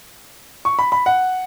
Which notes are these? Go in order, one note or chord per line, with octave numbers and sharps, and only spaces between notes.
C#6
B5
B5
F#5